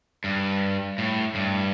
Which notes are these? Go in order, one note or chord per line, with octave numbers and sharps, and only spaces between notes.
G2
A2
G2